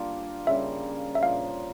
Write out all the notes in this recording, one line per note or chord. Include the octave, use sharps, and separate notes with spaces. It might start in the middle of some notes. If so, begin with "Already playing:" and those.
Already playing: G3 A#3 D4 F4
C#3 G3 A#3 E5
E5
A#2 F3 A#3 D4 F5